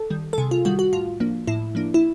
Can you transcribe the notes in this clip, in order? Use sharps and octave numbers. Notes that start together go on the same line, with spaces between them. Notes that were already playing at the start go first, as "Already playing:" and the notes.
Already playing: A4
D#3 G3
A4
C3 G#4
F4
D#3 G3 F#4
F#4
A2 F4
F3 A#3 D4
A2 E4
F3 A#3 D4
E4